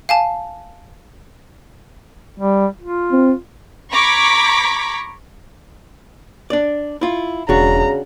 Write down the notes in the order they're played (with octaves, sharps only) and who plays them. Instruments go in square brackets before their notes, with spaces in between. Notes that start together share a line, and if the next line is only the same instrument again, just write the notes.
[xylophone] F5 G#5 A5
[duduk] G3
F4
[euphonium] C4
[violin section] A#5 B5 C#6 D6 G#6 B6
[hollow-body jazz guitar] D4 D5
E4 F4
[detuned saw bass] E1 [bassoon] C#3 [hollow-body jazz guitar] D4 F#4 [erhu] A#5